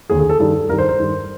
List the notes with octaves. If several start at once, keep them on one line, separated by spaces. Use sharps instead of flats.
D#2 D3 G#4
G#4
A4
G2 D#3 A4
G2 D#3 A#4
C5
C5
G2 D#3